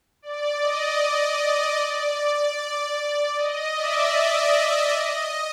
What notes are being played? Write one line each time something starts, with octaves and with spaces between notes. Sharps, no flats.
D5
D#5
D#5
D#5
D5
D#5
D5 E5
D#5
D5
D#5